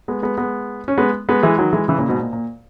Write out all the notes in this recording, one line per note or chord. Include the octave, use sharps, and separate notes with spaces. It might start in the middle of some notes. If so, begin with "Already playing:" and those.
G#3 B3
G#3 B3
G#3 B3
C#4
G#3 B3
G#3 B3
E3 G#3
D#3 F#3
E3 G#3
C#3 E3
A#2 C#3
G#2 B2
A#2
A#2